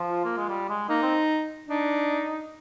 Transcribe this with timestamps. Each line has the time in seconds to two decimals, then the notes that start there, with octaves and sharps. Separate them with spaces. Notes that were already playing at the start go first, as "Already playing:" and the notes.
Already playing: F3
0.10 F4
0.25 A#3
0.37 G#3
0.49 G3
0.69 G#3
0.89 A#3 D#4
1.02 C4
1.69 D4 D#4